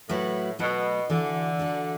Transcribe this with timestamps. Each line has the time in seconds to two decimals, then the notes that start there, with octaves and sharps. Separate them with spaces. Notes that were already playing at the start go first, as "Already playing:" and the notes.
0.09 A2 F#3 A3 F#4 B4
0.59 B2 F#3 A3 F#4 B4
1.09 D3 E3 D4 F#4 A4
1.59 E3 D4 F#4 A4